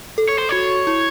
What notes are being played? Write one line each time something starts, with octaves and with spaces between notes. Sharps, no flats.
A4
C#5
C5
F#4 C#5
E4